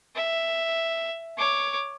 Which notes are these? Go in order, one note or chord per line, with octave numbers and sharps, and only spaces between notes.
E5
C#5 D6